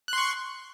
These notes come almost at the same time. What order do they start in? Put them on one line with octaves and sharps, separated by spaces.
F#6 C6 C#6